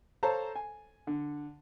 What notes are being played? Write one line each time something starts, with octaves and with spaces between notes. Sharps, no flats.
A4 C5 C#5 F5 A5 A#5
G#5
D3